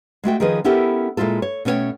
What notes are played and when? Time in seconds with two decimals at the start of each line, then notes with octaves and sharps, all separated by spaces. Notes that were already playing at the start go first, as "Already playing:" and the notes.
0.24 G#3 A3 F#4 G5
0.40 D#3 F3 C#4 G#4 B4 D#5
0.64 B3 C#4 E4 G4 A4 A#4
1.17 A#2 G#3 E4 F4 A4
1.42 C#5
1.65 B2 A3 C#4 F#4 C#5 G5